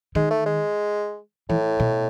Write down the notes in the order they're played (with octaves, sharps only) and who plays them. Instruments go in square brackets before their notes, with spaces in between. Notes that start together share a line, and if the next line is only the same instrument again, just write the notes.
[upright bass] D#3 [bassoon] G#3
[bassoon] A3
G#3
[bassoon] A2 [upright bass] E3
[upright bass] B2